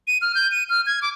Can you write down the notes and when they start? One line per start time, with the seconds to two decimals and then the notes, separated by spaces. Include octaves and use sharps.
0.07 D#7
0.22 F6
0.35 G6
0.52 D#7
0.69 F6
0.86 G#6
1.02 D6